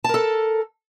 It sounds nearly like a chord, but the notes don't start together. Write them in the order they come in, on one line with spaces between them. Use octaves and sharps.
A5 A#4 A4